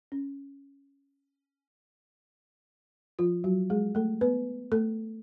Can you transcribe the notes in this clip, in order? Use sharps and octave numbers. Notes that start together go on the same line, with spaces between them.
C#4
F3 F4
F#3 F#4
G#3 G#4
A3 A4
B3 B4
A3 A4